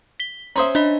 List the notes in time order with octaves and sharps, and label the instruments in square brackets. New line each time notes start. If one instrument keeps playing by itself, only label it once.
[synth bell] B6 G7
[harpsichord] C#4 C5 E5 [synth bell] A#5 C6 D#6
[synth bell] D4 D#5 B5